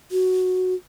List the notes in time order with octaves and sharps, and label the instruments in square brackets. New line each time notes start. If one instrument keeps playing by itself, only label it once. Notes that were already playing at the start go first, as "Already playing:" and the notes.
[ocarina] F#4